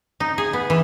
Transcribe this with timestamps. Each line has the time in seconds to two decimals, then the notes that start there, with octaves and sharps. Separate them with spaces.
0.20 D#4
0.38 G#4
0.53 B3
0.70 E3